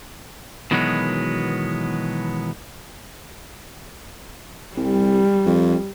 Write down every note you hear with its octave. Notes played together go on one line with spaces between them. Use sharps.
B2 D#3 E3 F#3 G#3 B3
C2 G3
F2